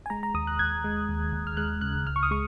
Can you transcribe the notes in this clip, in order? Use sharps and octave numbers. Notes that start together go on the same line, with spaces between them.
G#5
G#3 A#5
A#5
D#2 D#6
F#6
D#2 G#6
G#3
D#2
D#2
F6
G#3 F#6
C#3 F#6
C#2 F6
C#6
D#6
G#3 C#6